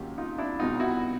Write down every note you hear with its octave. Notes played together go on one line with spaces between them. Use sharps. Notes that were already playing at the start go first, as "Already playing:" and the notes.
Already playing: D#2 C#3 F#3 F4 G4
D#4 F4
D4 E4
C2 B2 G3 D#4 F4
E4 F#4